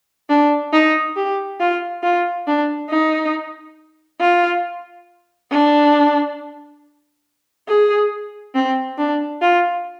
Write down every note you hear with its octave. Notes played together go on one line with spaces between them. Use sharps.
D4
D#4
G4
F4
F4
D4
D#4
F4
D4
G#4
C4
D4
F4